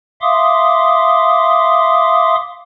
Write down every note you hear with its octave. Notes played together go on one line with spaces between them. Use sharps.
E5 F5 C6 D6 D#6